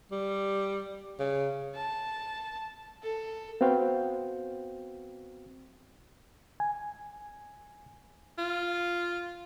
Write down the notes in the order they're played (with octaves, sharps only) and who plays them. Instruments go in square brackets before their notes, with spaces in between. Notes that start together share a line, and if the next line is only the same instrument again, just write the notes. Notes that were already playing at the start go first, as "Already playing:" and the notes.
[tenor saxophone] G3
C#3
[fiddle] A5
A4
[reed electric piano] B3 C4 F#4 F5 G5
G#5
[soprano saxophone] F4